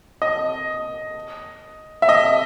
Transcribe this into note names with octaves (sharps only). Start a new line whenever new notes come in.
D#5
E5
D#5